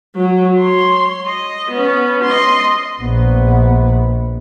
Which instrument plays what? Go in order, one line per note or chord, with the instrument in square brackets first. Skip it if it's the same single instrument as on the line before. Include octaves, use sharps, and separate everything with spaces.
[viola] F#3
C#5 C6
D#5
B3 C#4
D#5 C6
[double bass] A#1 B3